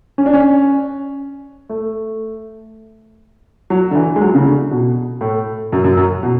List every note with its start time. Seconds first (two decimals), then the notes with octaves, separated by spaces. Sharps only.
0.18 C#4
0.26 D4
0.33 C#4
1.69 A3
3.70 F#3
3.91 D3
3.95 E3
4.16 G#3
4.21 F#3
4.35 C#3
4.46 D3
4.71 B2
5.21 A2
5.72 F#2
5.84 F#2
5.97 F#2
6.23 B2